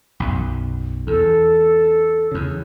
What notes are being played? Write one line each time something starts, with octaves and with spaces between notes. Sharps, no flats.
B1 F#2
E2 A4
E2 C#3